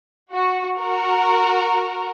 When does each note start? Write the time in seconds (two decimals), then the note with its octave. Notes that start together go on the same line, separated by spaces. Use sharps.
0.33 F#4
0.80 F#4 A#4